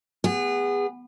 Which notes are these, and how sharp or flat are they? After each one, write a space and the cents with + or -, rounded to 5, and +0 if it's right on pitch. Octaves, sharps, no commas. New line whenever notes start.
B3 +0 G#4 -30